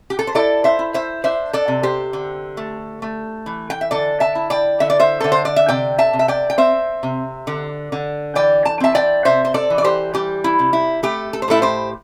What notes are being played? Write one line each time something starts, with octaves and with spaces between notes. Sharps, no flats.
G4
A4
C5
E4 A4 D5
C5 E5
E4
C5 E5
D4 C5 E5
A4 D5
C3
G4 C5
D3
A3
A3
E3
G5
E5
D3 A4 D5
E5 A5
E4
D5 G5
D3 E5
D5
C5 E5
D3 A4
C5
D5
E5
C3 D5 G5
E5 A5
C3
E5
D5 G5
G5
C4 C5 E5
C3
D3
D3
E3 D5 G5
A5
C4 E5 A5
D5 G5
C3 C5 E5
C5
A4 D5
E3
D5
G4 C5
G3 G4
E4
C3
E4
A3 G4
A4
C5
A2 E4 A4
G4 C5